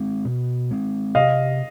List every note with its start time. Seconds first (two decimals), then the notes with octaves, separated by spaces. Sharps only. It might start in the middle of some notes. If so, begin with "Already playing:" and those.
Already playing: G#3 C4
0.25 B2
0.71 G#3 C4
1.15 C3 D#5 F5